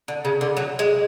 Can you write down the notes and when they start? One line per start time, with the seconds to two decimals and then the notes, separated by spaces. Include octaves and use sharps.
0.08 D3
0.25 C#3
0.41 D3
0.57 F#3
0.79 G#3